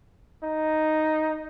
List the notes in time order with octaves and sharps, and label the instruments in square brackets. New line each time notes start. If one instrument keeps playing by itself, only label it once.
[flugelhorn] D#4